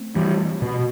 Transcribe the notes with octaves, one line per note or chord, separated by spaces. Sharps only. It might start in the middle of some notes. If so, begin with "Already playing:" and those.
Already playing: A3 C4
E3 G3
B2